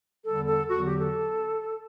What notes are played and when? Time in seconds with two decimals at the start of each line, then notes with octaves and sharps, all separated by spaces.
0.24 E2 D3 G3 A4
0.48 A4
0.70 E2 D3 F#3 F#4
0.86 G4
1.01 A4